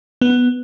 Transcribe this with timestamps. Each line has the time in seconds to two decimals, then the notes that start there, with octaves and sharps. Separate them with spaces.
0.21 B3